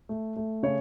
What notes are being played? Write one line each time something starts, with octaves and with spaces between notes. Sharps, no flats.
A3
A3
C#3 C#5